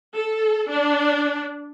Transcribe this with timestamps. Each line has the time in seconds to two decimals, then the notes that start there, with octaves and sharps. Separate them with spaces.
0.14 A4
0.71 D4